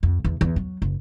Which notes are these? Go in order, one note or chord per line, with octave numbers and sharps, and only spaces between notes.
F2
E2
E2
F#3
F#1